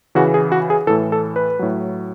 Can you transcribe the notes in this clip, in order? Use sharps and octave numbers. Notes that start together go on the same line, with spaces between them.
C#3 E3 F#4
G#4
F#4
G#4
A2 E3 A4
A4
B4
A2 F#3